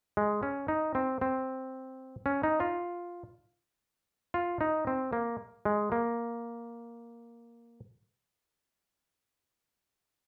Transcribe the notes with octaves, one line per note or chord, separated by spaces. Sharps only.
G#3
C#4
D#4
C4
C4
C#4
D#4
F4
F4
D#4
C4
A#3
G#3
A#3